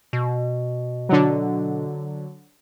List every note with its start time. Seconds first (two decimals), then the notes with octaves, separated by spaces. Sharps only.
0.13 B2
1.09 D3 F#3